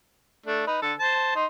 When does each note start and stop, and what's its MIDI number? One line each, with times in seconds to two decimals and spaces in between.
0.46 0.64 57
0.46 0.64 62
0.67 0.81 63
0.67 0.81 71
0.82 0.94 50
0.82 0.94 69
0.99 1.31 72
0.99 1.31 81
1.35 1.46 63
1.35 1.46 84